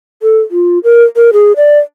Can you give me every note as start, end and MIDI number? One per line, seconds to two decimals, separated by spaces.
0.23 0.40 69
0.51 0.79 65
0.84 1.03 70
1.16 1.30 70
1.33 1.52 68
1.57 1.79 74